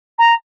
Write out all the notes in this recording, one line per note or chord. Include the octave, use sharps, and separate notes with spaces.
A#5